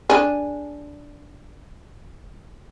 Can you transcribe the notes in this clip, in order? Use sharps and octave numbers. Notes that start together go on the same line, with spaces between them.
D4 G#4